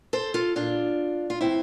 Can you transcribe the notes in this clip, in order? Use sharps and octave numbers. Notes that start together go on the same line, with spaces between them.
A4 C5
F4 A4
A#2 D4 F4
F4
A2 E3 C4 E4